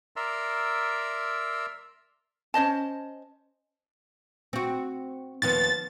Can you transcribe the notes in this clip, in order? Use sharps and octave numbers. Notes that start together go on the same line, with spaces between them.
A#4 D5 E5 A#5 C6 E6
C#4 C5 D#5 A5
C4 F#4
D#2 F3 B3 A6